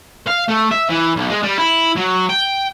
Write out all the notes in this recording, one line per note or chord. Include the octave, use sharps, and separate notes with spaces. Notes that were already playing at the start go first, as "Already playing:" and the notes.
F5
A3
E5
E3
B1
G#3
G3
E4
F#3
G5